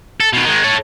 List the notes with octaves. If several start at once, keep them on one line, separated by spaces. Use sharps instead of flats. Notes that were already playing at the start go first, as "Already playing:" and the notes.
A4
B2 D#3
D#3 G#3
A4 C#5